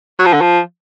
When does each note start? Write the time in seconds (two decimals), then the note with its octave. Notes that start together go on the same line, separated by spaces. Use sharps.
0.19 F#3
0.26 F3
0.33 D3
0.41 F3